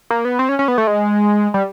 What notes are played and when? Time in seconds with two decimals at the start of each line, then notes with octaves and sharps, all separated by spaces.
0.11 A#3
0.25 B3
0.39 C4
0.49 C#4
0.59 C#4
0.68 B3
0.78 A3
0.87 G#3
1.54 G3